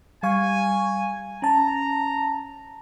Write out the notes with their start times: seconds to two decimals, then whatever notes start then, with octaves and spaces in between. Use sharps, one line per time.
0.23 G3 F5 G#5 C#6
1.42 C#4 A5 A#5